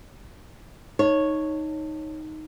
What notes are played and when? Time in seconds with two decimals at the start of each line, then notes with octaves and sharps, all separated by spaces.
0.99 D#4 C#5